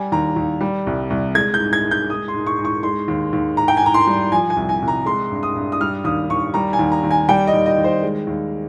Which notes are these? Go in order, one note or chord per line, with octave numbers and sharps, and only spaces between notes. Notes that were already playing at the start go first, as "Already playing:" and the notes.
Already playing: G3 G#5
D#2 A#5
D#2
G3
C2
C2
G#3 G#6
G6
G#2
G#6
G#2
G6
G#3 D#6
C6
G#2
C#6
G#2
C#6
G#3 C6
D#2
D#2
G#2 A#5
G5
G#5
G#2 A#5
C6
G3
F3 G#5
G#5
C2
G#5
C2
A#5
G#3 C6
G2
D#6
G2
D#6
G3 F6
D#2 D#6
D#2 C#6
G3 A#5
G#5
D#2
A#5
D#2
G#5
G3 G5
D#5
D#2
D#5
D#2
C5
G#3
D#2